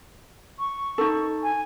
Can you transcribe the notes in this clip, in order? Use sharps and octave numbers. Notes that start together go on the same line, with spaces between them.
C#6
D#4 A4
G#5